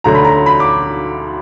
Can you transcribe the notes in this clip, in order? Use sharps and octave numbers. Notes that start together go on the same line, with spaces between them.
D2 D3 F#3 A#5
B5
A#5
B5
D6